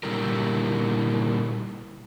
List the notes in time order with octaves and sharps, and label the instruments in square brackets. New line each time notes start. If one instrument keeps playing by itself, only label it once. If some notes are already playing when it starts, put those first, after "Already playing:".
[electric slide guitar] A#2 D3 G3 E4 G4 A#4